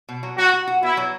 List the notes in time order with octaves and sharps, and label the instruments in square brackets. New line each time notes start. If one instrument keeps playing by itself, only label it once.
[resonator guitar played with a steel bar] B2
F#3
[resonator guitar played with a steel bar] F#3 [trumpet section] F#4
[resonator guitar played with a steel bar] F#4
F#4
[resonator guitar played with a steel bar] B3 [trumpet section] E4
[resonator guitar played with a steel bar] F#3